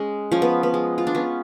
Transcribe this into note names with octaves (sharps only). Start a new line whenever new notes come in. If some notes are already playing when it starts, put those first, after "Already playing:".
Already playing: G#3 C#4
F3 C#4
B3
B3
G#3
F4
D4
B3 C#4